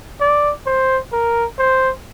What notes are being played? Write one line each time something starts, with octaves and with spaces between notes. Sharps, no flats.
D5
C5
A#4
C5